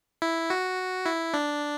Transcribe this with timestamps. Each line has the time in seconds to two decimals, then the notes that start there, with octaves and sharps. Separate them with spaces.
0.22 E4
0.50 F#4
1.06 E4
1.34 D4